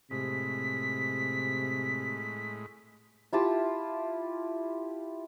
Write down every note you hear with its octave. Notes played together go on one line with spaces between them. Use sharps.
A2 C3 G#3 B6
E4 F4 G4 A5